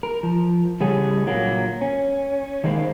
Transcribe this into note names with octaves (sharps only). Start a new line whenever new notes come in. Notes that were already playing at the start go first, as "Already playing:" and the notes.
A#4
F3
C#3 G3 C#4 G#4 A4
A#2 D3 F#3 A#3
C#4
D#3 G#3 A#3 C5